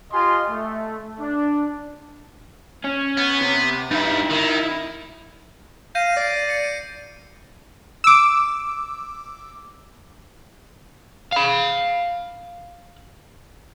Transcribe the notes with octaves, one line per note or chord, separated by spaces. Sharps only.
F4 G4 D#5 F5 G#5 C6
A3
D4
C#4
B3
C3
G2 D#4 E4
D#3
F5 G6 A#6 D#7
D5 C7
C#7 D#7
D6 E6
F5 B5